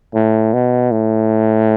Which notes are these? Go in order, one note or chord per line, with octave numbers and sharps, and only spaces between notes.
A2
B2
A2